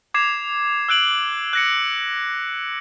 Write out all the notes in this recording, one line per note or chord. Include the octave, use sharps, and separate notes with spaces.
D6 G#6 C7 E7
E6 F#6 D7 F#7
F#6 A#6 C#7